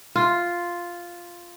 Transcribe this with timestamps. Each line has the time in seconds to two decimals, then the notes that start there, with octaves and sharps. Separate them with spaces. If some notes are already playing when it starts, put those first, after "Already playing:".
0.16 F4